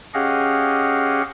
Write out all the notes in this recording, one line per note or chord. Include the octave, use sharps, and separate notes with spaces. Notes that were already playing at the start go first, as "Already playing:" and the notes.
C#4 G4 G#4 D#5 F5 F#5